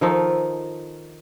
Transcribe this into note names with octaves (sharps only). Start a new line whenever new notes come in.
D#3 F3 D#4 A4